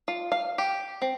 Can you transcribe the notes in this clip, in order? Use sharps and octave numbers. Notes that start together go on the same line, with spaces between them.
F4
F5
G4
C4